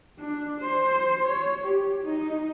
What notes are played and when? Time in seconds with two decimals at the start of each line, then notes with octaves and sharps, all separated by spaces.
0.19 D4
0.60 C5
1.25 C#5
1.64 G4
2.04 D#4